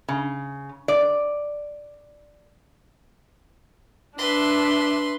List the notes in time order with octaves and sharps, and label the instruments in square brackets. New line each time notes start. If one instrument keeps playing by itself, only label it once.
[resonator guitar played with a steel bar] C#3
D5
[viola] D4 E5 [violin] B4 C6